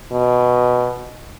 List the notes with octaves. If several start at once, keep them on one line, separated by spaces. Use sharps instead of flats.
B2